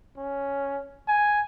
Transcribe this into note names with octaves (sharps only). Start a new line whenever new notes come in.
C#4
G#5